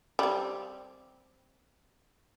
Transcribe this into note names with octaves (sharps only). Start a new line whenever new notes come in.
G3 C4